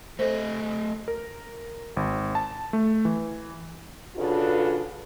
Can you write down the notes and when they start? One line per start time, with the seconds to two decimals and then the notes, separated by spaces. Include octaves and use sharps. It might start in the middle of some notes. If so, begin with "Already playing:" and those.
0.19 A3 A4 C5 D#5
1.08 A#4
1.97 G#1
2.35 A5
2.73 A3
3.05 E3
4.16 C#3 D4 F4 F#4 A4 B4